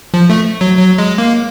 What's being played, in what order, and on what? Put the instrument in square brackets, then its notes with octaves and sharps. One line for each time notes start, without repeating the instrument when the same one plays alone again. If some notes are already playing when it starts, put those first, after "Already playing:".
[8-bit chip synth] F3
A3
F#3
F#3
G#3
A#3